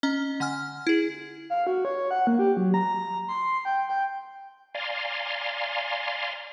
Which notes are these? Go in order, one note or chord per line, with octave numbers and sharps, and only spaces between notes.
C#4 D#5 A#5
D3 F#5 G#5 F6
E4 G#4
F5
F#4
C#5
F#5
A#3
G4
F#3
A#5
C6
G5
G5
D5 F5 G#5 A#5 C6